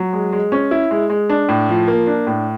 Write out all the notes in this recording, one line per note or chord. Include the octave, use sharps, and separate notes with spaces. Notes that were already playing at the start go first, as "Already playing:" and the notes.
Already playing: F#3
G#3
G#3
C#4
E4
G#3
G#3
D4
A2
F3
A#3
D4
A2